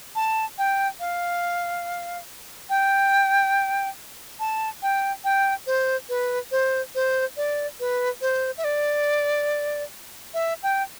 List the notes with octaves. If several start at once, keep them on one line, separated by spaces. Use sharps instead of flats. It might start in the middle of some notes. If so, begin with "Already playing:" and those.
A5
G5
F5
G5
A5
G5
G5
C5
B4
C5
C5
D5
B4
C5
E5
D5
E5
G5